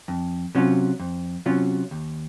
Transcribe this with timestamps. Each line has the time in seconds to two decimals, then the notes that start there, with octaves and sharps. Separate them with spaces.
0.08 F2
0.55 C3 F#3 C#4 F4
1.00 F2
1.46 C3 F#3 C#4 F4
1.91 D#2